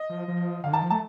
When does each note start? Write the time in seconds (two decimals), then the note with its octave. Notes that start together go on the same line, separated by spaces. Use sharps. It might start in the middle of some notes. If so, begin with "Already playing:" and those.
Already playing: D#5
0.09 F3
0.28 F3
0.64 D3 F5
0.72 D#3 A5
0.82 F3
0.90 A3 A5